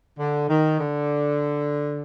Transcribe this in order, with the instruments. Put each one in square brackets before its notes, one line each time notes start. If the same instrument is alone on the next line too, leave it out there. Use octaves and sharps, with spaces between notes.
[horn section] D3
D#3
D3